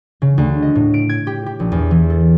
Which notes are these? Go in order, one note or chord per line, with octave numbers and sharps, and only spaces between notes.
C#3
D2
D#5
A2
D7
G#6
G4
G4
A#1
E2
E3
A4